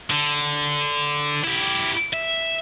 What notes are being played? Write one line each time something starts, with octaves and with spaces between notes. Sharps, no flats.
D3
E4 G4
E5